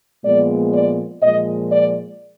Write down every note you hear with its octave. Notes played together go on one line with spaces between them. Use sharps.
A#2 F3 G#3 B3 D5
D5
A#2 F3 G#3 D#5
D5